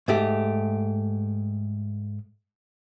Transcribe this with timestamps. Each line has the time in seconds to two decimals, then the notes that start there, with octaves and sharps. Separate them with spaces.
0.08 G#2 A3 G4